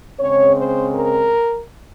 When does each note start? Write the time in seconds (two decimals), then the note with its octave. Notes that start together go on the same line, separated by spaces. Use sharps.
0.19 C#3 G#3 C4 C#5
0.57 C5
0.95 A#4